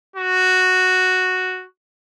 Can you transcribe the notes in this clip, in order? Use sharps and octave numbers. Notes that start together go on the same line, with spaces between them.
F#4